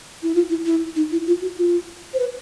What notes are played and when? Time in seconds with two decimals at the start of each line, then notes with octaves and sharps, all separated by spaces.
0.23 E4
0.34 F4
0.49 E4
0.66 E4
0.96 D#4
1.12 E4
1.27 F4
1.42 F#4
1.58 F4
2.14 C5
2.19 B4